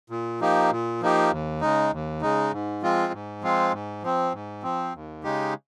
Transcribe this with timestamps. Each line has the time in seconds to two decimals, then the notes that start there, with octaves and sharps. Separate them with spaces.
0.10 A#2
0.40 F3 A#3 D#4 G4
0.71 A#2
1.01 F3 A#3 D#4 G4
1.31 D#2
1.61 C#3 G#3 D#4
1.92 D#2
2.22 C#3 G#3 D#4
2.52 G#2
2.82 F3 G#3 C4 F4
3.13 G#2
3.42 F3 G#3 C4 F4
3.73 G#2
4.03 F3 C4
4.33 G#2
4.63 F3 C4
4.94 D#2
5.24 C#3 G#3 D#4 G4